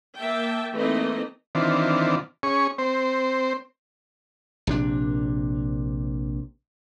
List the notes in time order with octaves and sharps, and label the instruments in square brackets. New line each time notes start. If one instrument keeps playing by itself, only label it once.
[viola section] A#3 E5 G5 A5
E3 A3 A#3 C4 D#4 D#5
[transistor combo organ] D#3 E3 C4 D4 F4
C#4 G#4 C#6
C4 C5
[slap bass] A#1 C3 D4